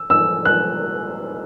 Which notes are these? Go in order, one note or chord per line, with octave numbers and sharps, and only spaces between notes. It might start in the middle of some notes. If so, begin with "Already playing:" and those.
Already playing: E6
E6
F#6